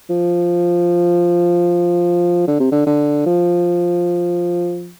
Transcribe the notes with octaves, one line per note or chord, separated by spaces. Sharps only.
F3
D3
C3
D3
D3
F3